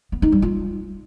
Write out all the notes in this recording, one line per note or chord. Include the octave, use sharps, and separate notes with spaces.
B3
D#4
G3
F4